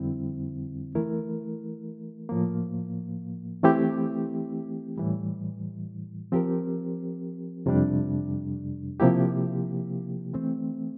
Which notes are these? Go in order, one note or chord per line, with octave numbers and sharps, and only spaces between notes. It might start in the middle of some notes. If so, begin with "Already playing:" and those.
Already playing: F2 D3 G3 C4 E4
E3 A3 E4 A#4
A2 F3 A#3
E3 A3 C4 E4 G4
A2 E3 G3
F3 C4 G4 A#4
F2 C3 G3 D4
C3 F3 A#3 E4 G4
E3 A3 C4